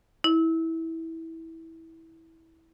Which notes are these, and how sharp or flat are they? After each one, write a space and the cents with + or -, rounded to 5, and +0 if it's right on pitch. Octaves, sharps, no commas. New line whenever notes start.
E4 -15